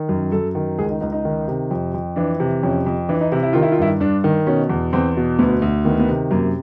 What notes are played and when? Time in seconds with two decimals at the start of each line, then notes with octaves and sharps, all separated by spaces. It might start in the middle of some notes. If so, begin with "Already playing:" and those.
Already playing: D#3
0.09 F#2
0.32 F#2 A4
0.55 D#3
0.78 C#2 G#4
0.89 D#4
1.01 C#2 D#4
1.12 D#4
1.25 D#3
1.48 C3
1.71 F2
1.94 F2
2.16 E3 D4
2.40 C3
2.63 F2 C#4
2.86 F2
3.09 E3 D4
3.21 D#4
3.32 C3 E4
3.43 E4
3.53 D#3 F4
3.62 E4
3.72 F4
3.78 G2 E4
4.00 G2 D4
4.24 D#3
4.47 B2 C#4
4.69 E2
4.93 E2 C4
5.17 B2
5.39 D2 B3
5.62 D2
5.85 D#3 B3
5.93 A#3
6.00 B3
6.09 C3
6.31 F#2 A#3